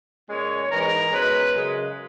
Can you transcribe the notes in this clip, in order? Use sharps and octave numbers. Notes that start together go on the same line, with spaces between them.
A#2 G#3 C#4 C#5
G#2 E3 G#3 A#4
B2 G#3 C#4 B4
F#2 C#3 G#3